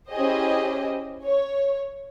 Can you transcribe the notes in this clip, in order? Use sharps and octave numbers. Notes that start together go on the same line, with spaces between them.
C#4 E4 G4 G#4 C5 D#5
C#5